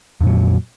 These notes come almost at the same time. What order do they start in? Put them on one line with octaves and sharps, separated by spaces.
F2 A#2 F#3